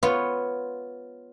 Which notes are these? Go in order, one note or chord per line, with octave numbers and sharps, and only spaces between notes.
B3 F4 C#5